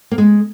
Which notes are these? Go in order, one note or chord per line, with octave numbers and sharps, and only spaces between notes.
A#3
G#3